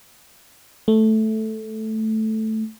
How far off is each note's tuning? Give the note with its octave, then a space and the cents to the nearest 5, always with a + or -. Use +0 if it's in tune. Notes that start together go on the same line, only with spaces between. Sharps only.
A3 -5